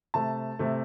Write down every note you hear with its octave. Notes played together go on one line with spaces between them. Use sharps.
C3 A3 A5
C3 A3